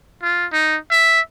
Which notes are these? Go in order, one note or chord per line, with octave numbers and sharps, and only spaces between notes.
F4
D#4
E5